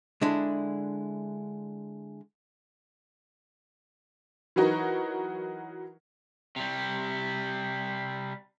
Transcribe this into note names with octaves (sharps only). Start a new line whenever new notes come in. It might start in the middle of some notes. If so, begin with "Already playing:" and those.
D3 G#3 D4 E4
E3 F#3 D#4 F#4 A#4
C3 G3